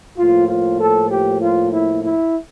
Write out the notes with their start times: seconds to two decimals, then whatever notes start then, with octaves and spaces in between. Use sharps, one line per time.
0.17 A2 F3 A#3 F4
0.48 F4
0.79 A4
1.10 G4
1.40 F4
1.71 E4
2.03 E4